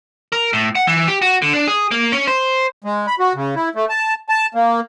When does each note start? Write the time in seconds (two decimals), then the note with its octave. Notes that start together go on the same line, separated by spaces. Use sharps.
0.32 A#4
0.53 A2
0.75 F#5
0.87 E3
1.08 G4
1.22 F#4
1.42 D3
1.53 D4
1.67 G#4
1.91 A#3
2.12 C#4
2.27 C5
2.84 G#3
3.07 B5
3.20 F#4
3.35 C#3
3.56 E4
3.75 A3
3.89 A5
4.29 A5
4.55 A#3